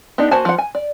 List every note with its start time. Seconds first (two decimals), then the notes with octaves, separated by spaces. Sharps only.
0.18 B3 D4 D#4 G4
0.31 A#3 F#4 C5 G#5 A5
0.45 F3 F#5
0.58 G#5
0.75 D5